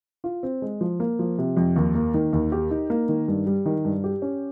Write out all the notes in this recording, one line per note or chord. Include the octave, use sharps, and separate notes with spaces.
F4
C4
G#3
F3
A#3
F3
C3
F2
D#2
A#3
D#3
D#2
G4
D#4
A#3
D#3
G2
G3
D#3
G2
G4
C#4